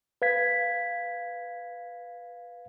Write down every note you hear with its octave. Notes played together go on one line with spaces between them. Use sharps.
B4 F5 G#6 B6